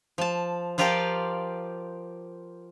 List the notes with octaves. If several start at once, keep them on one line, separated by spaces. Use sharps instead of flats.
F3 A5
F3 F4 G4 A#4 D5 F5